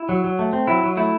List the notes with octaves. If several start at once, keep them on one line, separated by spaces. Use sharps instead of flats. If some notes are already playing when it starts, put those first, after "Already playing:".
Already playing: E4
F#3
F#3
A3
C4
F#3 E4
F#3
A3 E4